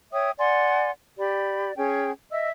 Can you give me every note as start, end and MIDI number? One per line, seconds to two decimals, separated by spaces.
0.12 0.31 73
0.12 0.31 76
0.12 0.31 79
0.12 0.31 87
0.39 0.90 74
0.39 0.90 78
0.39 0.90 80
0.39 0.90 84
1.18 1.72 67
1.18 1.72 74
1.18 1.72 83
1.77 2.11 61
1.77 2.11 68
1.77 2.11 79
2.31 2.50 75
2.31 2.50 76
2.31 2.50 88